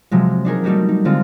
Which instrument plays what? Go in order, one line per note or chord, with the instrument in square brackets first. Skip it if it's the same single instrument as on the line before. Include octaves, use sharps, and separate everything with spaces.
[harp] C3 F3 F#3 G#3
D4 D#4 G#4 A#4
G3 A3 D#4 F#4 G4
D#4
D3 G#3 C4 F4